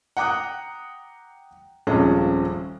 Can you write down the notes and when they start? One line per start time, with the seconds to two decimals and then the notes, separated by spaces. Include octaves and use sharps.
0.17 F#5 G5 A#5 D6 D#6 F#6
1.87 D#1 G#1 F3 G#3 C#4